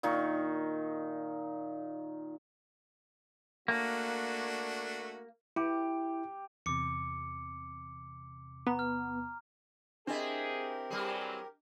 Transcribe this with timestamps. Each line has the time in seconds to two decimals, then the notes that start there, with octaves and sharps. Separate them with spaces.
0.03 A#2 D#3 D#4 C#6
3.68 A3 A#3 D4 F#4
5.56 E4 G4
6.66 E2 C3 D6 C#7
8.67 B3 A#5
8.79 F6
10.07 C4 D4 E4 G4 G#4 A#4 D#5
10.90 E3 F#3 G3 C4 G#4